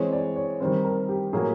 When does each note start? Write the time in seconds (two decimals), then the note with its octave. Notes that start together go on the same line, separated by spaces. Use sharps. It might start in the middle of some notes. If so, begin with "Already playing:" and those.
Already playing: E3 G#3 C4 C#5
0.13 D5
0.36 C#5
0.60 D#3 G3 C4 C5
0.84 A#4
1.09 G4
1.33 A2 F#3 A#3 G#4